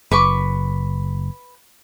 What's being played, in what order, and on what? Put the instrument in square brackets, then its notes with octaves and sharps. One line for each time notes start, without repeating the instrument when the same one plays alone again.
[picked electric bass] F#1 [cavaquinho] B4 C#6 D6